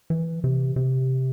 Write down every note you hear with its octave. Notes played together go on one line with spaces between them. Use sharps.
E3
C3
C3